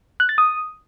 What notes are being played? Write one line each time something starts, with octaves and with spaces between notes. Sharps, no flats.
F#6
A6
D#6